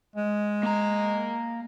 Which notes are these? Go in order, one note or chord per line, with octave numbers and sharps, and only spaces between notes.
G#3
A#3 A#5